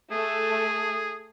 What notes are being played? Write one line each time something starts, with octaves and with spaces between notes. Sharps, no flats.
A3 G#4